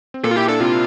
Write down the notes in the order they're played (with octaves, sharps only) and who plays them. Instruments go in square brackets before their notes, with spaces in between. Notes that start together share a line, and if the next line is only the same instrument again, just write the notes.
[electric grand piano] C4
[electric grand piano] A#2 A#3 [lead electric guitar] A4
[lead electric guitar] F4
[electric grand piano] E4 [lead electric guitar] G4
[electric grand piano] D4 [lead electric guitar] A4
[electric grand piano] C3 C4 [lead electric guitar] F4